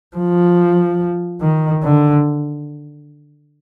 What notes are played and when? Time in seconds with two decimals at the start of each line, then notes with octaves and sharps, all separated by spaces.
0.16 F3
1.41 D#3
1.83 D3